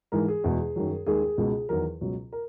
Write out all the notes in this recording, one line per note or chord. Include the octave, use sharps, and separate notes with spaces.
G#2 E3 G#3 A#4
G#4
E2 B2 G#3
F#2 D#3 F#3
D#2 D#3 G#3 G#4
G#4
C#2 B2 G#3
E2 D#3 F#3 A#4
C#2 B2 F#3
A#4